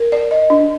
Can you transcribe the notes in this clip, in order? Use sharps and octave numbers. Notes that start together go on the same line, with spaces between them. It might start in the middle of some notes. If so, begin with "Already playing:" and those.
Already playing: A#4
D5
D#5
D4